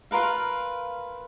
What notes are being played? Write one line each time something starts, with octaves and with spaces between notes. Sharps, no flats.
F4 A#4 B4 F5